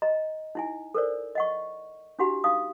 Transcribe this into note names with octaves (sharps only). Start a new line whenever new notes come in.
D#5 A#5
D#4 E4 G#5
A4 A#4 C5 D5
D#5 F#5 C#6
D4 E4 F#4 G4 F#5 B5
D#4 F5 D#6